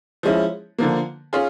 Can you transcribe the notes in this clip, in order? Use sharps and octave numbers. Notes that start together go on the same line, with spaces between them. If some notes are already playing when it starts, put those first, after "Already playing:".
F3 G#3 C#4 E4
D3 F3 A#3
C#4 F4 G#4